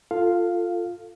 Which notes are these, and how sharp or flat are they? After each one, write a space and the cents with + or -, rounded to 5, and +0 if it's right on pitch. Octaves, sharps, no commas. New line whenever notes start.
F4 +0 A4 +15 F5 +0